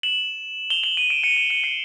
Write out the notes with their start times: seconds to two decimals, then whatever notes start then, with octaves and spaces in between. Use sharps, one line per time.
0.03 E7 F#7
0.70 F7 G7
0.84 E7 F#7
0.97 D#7 F7
1.10 D7 E7
1.23 C#7 D#7
1.36 D7 E7
1.50 C#7 D#7
1.64 C7 D7